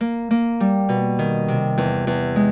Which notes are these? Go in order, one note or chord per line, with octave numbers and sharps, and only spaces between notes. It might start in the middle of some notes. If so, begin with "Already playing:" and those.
A#3
A#3
G3
B2
D#3
C3
E2
E2
G#3